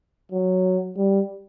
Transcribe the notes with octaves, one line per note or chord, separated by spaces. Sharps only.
F#3
G3